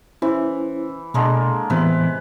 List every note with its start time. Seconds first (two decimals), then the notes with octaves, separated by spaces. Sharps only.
0.22 E3 C#4 E4 C5
1.14 B2 D3 G#3 A#3
1.70 A2 C3 E3 B3 B4